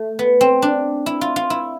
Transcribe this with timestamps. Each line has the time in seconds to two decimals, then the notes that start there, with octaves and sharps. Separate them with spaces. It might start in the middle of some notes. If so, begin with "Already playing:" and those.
Already playing: A3
0.19 B3
0.41 C4
0.62 D4
1.06 E4
1.21 F4
1.36 F4
1.50 E4